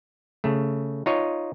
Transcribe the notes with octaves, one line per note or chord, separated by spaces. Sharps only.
C#3 A3
D#4 F4 C#5 D#5